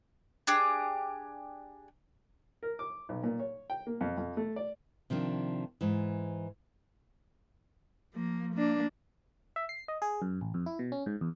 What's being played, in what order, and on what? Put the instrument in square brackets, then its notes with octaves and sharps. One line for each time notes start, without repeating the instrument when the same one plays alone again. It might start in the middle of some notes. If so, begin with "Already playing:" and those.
[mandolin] D4 G4 G#4
[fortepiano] A#4
D6
B1
A#2
C#5
G5
A#3
F2
F2
A3
D5
[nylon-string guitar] C3 D#3 F3 D4
G#2 E3
[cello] F3 A#3
A#3 D4
[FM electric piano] E5
C7
D#5
G#4
F#2
A1
F2
E4
B2
C#4
G#2
E2